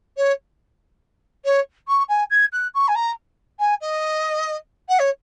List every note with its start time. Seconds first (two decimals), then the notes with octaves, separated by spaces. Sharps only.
0.17 C#5
1.44 C#5
1.88 C#6
2.08 G#5
2.30 G#6
2.52 F#6
2.74 C#6
2.88 G#5
2.95 A#5
3.59 G#5
3.81 D#5
4.88 F#5
4.99 C#5